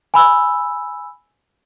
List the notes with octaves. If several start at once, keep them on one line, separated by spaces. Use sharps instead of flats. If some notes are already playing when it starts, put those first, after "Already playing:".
G#5 B5 E6